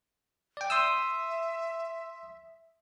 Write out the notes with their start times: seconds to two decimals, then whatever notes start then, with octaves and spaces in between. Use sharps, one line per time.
0.57 D5 G5
0.70 E5 C6 D#6 E6